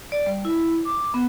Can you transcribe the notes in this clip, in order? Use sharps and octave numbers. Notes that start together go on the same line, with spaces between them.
D5
G3
E4
D6
B3